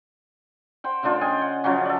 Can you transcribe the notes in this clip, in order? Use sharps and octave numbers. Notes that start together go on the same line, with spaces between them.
C5 F#5 G5
C#3 A3 D4 F4
D#5 G5 G#5
F#5
C#3 F3 F#3 C#4
A4 D5